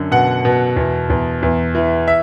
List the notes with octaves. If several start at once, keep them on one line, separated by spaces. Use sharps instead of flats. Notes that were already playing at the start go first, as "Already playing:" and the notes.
Already playing: F#2 D3
B2 F#5
B2
E2
E2
E2
E3
E5